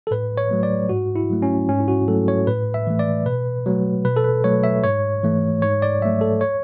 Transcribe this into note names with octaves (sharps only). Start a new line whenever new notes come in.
A4
A2 B4
C#5
F#3 A3
D5
G#2 F#4
E4
F#3 A3
C#4
G#2 C#4
E4
F#4
F#3 A3 A4
C#5
A2 B4
E5
E3 A3
D5
B2 B4
F#3 A3
B2 B4
A4
B4
F#3 A3 C#5
E5
G#2 C#5
E3 A3
G#2 C#5
D5
F#3 A3 E5
A4
C#5